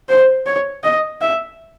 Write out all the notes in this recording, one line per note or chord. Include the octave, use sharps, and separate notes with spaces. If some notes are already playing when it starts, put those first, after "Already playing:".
C5
C#5
D#5
E5